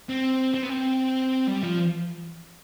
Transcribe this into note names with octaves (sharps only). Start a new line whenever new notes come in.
C4
C4
B3
C4
G3
F3